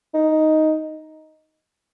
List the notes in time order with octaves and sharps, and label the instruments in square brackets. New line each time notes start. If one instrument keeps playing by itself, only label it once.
[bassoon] D#4